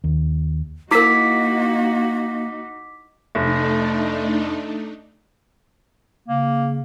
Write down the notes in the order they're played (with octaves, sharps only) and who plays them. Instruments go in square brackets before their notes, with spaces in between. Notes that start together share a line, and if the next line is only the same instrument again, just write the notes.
[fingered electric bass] D#2
[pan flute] A#3 [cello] D#4 F#4 [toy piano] E4 A#4 [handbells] D6 B6
[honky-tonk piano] F1 [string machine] A3 D4 D#4
[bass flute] C#3 [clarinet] A#3